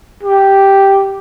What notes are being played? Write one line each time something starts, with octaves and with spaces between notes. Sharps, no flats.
G4